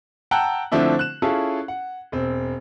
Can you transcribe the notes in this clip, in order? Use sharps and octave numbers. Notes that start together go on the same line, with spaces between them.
F#5 G5 A5 A#5 E6 F#6
D3 F3 A3 C4 D4 E4
F#6 E7
C#4 E4 F4 G#4 A4
F#5
E1 C4